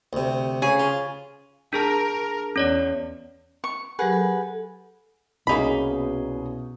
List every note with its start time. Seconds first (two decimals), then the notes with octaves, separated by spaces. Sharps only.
0.13 D2 C3
0.62 C#3 G#4 G#5
0.79 F4
1.73 D4 G#4 A#4 A5
2.56 E2 C#4 C#5 D5
3.64 C#6
3.99 F#3 G4 G#4 A#4 B4 F#5
4.12 A4
5.47 C2 B2 A#3 C#4 D#4 G#4 B5